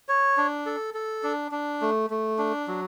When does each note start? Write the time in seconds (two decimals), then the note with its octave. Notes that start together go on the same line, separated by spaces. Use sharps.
0.09 C#5
0.37 D4
0.66 A4
0.94 A4
1.23 D4
1.52 D4
1.81 A3
2.10 A3
2.38 D4
2.68 F#3